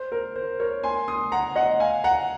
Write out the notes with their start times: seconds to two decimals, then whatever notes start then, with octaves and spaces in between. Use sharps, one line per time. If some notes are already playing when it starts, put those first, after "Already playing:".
Already playing: C5
0.12 A#4
0.36 C5
0.60 A#4 C#5
0.83 G#5 C6
1.08 C6 D#6
1.32 F#5 A#5
1.56 D#5 F#5
1.80 F5 G#5
2.04 F#5 A#5